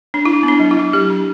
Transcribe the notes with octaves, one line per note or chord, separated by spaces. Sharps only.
D4
D4 E4
B3
D4
F#3
E4
F#3
F#3 G4
D4